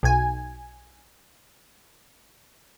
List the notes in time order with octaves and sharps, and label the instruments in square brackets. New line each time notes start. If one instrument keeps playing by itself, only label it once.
[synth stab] B1 G#5